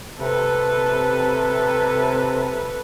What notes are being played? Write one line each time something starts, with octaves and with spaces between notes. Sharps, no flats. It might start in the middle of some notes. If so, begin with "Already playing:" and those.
C3 A4 B4